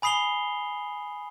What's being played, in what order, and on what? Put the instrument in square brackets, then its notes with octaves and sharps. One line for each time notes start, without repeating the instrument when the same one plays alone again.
[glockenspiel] G#5 B5 D#6 C7 F7 G7